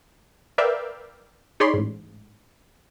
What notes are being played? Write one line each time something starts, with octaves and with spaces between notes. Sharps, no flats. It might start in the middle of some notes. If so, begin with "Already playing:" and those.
A#4 B4 D5 E5 F5 G5
D#4 G#4 C#5 D5 B5 C6
A1 G#2